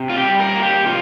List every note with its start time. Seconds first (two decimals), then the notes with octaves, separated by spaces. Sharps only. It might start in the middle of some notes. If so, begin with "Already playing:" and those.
Already playing: C3
0.10 F4
0.17 G4
0.24 G3
0.40 A#4
0.55 A#3 F4
0.63 G4
0.86 C3 F4